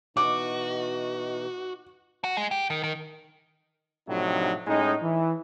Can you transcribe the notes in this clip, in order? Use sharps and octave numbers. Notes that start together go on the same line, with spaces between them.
B2 E3 D#4 F#4 D6
F#4
G#3
G4
D#3
D#3
A2 C3 F3 F#3 D4 D#4
A2 G#3 C#4 D#4
E3